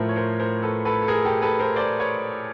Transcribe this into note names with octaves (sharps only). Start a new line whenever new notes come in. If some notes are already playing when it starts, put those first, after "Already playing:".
Already playing: A2 F3 A3 A#4 C5
C#5
A#4 C5
A#4 C5
A4 B4
A4 B4
A4
G#4 A#4
G4 A4
A4 B4
A#4 C5
C5 D5
B4 C#5